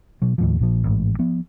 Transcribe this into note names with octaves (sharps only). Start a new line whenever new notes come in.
B2 F#3
D#2 A2 F3
A#1 A#2 F3
A1 G#2
F3 B3